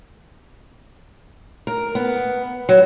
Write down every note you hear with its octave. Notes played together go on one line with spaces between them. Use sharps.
A#4
B3
F#3